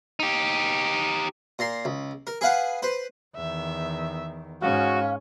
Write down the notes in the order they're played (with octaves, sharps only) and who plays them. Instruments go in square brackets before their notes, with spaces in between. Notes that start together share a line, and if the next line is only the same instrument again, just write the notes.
[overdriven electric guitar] D#4 G4
[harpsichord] A#2 A#5 C6
C#2
A#4
G#4 B4 F5 F#5
B4 C5
[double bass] E2 D#3 [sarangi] E5
[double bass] G#2 [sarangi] C#4 [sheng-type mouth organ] F#4 [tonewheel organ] F5